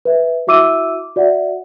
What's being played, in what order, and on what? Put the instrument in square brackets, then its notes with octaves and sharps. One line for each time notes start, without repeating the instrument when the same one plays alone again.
[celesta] B4 E5
E4 F#4 E5 D6 E6 D#7
F#4 D5 E5 F#5